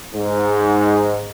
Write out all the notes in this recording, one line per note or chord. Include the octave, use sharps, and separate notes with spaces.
G#2